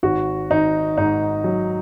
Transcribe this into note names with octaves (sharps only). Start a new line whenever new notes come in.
G#1 F#4
G#1 D#4
G#2 D#4
F#3